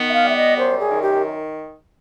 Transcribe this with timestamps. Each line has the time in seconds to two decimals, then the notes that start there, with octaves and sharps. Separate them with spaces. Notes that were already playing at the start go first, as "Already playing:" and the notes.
Already playing: D#3 B3
0.09 E5
0.13 F5
0.25 G3 E5
0.36 D#5
0.58 F#2 C5
0.79 G#4
0.91 D#3
1.02 G4